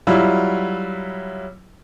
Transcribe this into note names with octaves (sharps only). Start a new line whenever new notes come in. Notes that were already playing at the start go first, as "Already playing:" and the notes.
F#3 G3 E4 F4